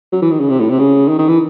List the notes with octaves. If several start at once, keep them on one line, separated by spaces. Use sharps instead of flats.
F#3
E3
D#3
C#3
C3
A2
C3
C#3
D#3
D#3
E3